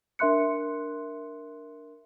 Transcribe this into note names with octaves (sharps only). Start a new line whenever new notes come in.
D4 A#4 E5 C6 F#6 C#7